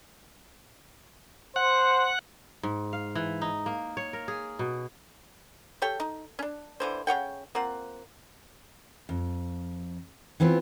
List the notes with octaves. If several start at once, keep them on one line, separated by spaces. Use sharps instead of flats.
C5 F#5
G#2
F5
E3
D#4
A#3
C#5
A#4
G#4
B2
G4 A4 C#5 G5
D#4
C#4 D4
D3 E3 C5
C#3 C#5 F#5 G5
A#3 C4 F4 F#5
F2
E3 B3 C4 F4 B4